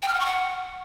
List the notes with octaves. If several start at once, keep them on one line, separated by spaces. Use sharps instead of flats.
G5
F6
F#5
C#6
F#5